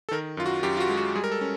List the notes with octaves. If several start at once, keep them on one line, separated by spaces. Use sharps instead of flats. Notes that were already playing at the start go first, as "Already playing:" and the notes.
A4
D#3 A#4
F#2 F4
F#4
F#2 G4
F4
F#4
G#3
F#4
G3 G#4
A#4
A4
C#4